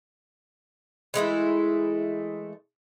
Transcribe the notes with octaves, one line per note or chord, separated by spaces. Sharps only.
E3 G#3 A3 E4